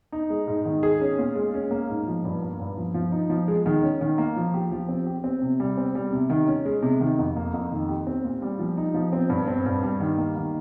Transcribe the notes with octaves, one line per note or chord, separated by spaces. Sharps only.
D#4
G#3
G#2
D#3
G#4
C#4
A#2
G#3
C#4
A#3
G#2
F3
G2
A#3
G2
F3
F3
D#4
F3
G#3
D#3
C#4
D#3
A#3
F3
G4
F3
C4
G4
C4
C3
G3
C4
G3
C3
D#3
C#4
G#3
C3
D#3
F2
A#3
F2
D#3
G4
C4
A#2
G3
F3
D#4
F3
C4
G2
C4
G2
G3
D#3
A#3
D#3